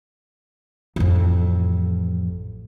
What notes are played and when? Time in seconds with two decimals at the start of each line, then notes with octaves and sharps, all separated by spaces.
0.96 A1 F2